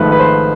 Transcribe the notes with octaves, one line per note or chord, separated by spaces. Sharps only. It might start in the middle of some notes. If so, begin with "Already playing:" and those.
Already playing: G#1 G#2 F3 A3 B4
B4
C5